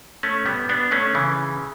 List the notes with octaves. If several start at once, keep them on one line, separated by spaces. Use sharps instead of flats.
A3 C#4
G3 B3
B3 D4
A3 C#4
C#3 E3